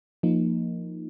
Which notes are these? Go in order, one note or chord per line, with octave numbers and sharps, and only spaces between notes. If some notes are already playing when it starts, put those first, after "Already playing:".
F3 A#3 D#4